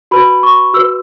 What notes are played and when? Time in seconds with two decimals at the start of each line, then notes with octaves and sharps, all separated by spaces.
0.11 F#4 B4 B5
0.43 C#6
0.73 F#4 B4 E6